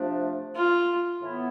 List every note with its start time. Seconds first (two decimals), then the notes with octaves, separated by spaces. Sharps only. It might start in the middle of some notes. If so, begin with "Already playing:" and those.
Already playing: C3 F3 A3 D4
0.55 F4
1.22 A2 E3 B3 E4